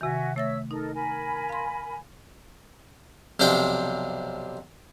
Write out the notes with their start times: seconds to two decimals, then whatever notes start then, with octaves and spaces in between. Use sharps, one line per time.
0.01 C3 D#3 F#4 E5 G#5
0.36 A3 C#5 E5 E6 A6 A#6
0.71 D#4 A4 A#4 D#5
0.95 A#4 G#5 B5
1.49 F5 C6
3.40 B1 C3 F3 D4 C5 G5